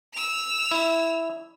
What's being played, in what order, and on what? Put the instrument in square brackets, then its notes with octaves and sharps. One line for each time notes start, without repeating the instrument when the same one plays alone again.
[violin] E6 F7
[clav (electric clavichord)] E4